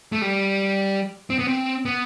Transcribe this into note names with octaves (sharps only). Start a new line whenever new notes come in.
A3
G3
C4
B3
C4
B3